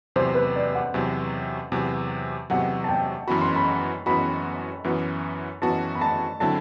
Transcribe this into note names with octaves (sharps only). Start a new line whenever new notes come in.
E2 C3 F#3 C5
B4
D5
F#5
E2 C3 F#3
E2 C3 F#3
E2 C3 F#3 F#5
A5
G5
F#2 E3 B3 F#4 B5
C6
B5
F#2 E3 B3 F#4 B5
F#2 E3 B3 F#4
F#2 E3 B3 F#4 A5
B5
A5
D3 F#3 C4 E4 A5